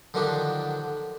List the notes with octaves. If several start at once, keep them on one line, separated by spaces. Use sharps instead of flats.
D3 D#3 F3 F#3 D4 G4